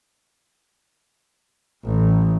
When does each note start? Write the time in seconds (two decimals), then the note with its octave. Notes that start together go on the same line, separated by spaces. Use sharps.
1.83 A1